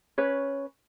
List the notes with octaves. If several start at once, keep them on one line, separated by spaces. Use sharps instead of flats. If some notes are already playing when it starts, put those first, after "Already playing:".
C#4 B4 C#5